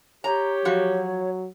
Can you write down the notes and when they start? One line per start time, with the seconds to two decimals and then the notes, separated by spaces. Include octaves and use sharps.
0.24 G4 C#5 A#5
0.65 F3 F#3 F#4